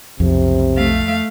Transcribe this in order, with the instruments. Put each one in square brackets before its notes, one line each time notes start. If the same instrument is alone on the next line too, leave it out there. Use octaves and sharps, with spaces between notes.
[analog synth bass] B1 [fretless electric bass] F2 [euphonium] C3
[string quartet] A3 F5